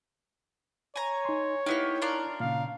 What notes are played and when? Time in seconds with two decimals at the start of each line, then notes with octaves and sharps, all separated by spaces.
0.96 C#5 G#5 A#5
1.25 D#4 C6
1.66 A#3 B3 D#4 E4 G4
2.02 D4 F4 A#4
2.40 A#2 C#3 F5